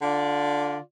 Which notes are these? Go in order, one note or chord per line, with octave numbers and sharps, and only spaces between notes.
D3 F4 D5